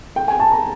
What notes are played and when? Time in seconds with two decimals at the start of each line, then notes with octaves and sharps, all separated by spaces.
0.16 G5
0.28 G#5
0.40 A5
0.51 A#5